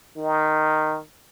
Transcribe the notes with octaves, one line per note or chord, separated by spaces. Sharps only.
D#3